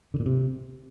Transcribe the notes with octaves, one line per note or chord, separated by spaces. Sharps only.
D3
A#2
C3